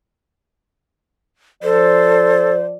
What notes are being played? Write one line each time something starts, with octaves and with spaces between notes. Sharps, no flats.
F3 A4 C5 D5